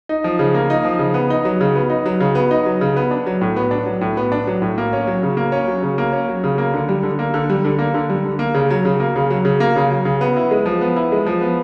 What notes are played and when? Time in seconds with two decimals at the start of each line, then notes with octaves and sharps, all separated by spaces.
0.09 D#4
0.24 F3
0.39 C#3
0.54 A#3
0.70 D#4
0.84 F3
0.99 C#3
1.14 B3
1.30 D#4
1.45 F#3
1.61 C#3
1.76 B3
1.90 D#4
2.06 F#3
2.20 C#3
2.35 B3
2.51 D#4
2.66 F#3
2.81 C#3
2.96 B3
3.11 D4
3.26 F#3
3.41 A2
3.56 B3
3.71 D4
3.86 F#3
4.01 A2
4.17 B3
4.32 D4
4.47 F#3
4.62 A2
4.78 A#3
4.93 C#4
5.07 F#3
5.23 C#3
5.37 A#3
5.52 C#4
5.68 F#3
5.83 C#3
5.98 A#3
6.13 C#4
6.29 F#3
6.44 C#3
6.58 A#3
6.74 D3
6.89 G3
7.03 D3
7.19 A#3
7.34 D3
7.50 G3
7.65 D3
7.79 A#3
7.94 D3
8.10 G3
8.24 D3
8.39 A#3
8.54 C#3
8.70 F#3
8.85 C#3
9.00 A#3
9.16 C#3
9.30 F#3
9.45 C#3
9.60 A#3
9.76 C#3
9.91 F#3
10.05 C#3
10.21 B3
10.37 E4
10.51 G#3
10.66 F3
10.81 B3
10.96 E4
11.12 G#3
11.26 F3
11.41 B3